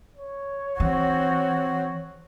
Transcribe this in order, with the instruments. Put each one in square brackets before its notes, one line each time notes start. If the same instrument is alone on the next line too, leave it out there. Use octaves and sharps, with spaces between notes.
[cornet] C#5
[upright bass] E3 [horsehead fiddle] C4 F#4